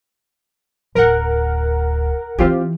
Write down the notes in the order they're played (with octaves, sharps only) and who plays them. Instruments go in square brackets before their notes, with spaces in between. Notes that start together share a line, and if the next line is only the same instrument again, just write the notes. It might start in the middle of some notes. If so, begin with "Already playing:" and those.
[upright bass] D1 [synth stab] A#4 F#5
[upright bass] E3 [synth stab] C4 F4 G4